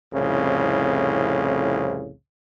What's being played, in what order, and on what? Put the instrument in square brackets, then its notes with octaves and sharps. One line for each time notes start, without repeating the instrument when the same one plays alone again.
[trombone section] C2 F2 A2 C#3